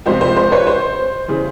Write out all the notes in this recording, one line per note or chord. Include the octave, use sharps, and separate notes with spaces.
C#2 C3 F3 C5
C5
C5
B4 C#5
C5
C#3 E3 G3